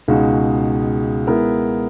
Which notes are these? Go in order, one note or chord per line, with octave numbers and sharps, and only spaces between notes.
C#2 B2 G#3 D#4 F#4
G#3 B3 E4 A#4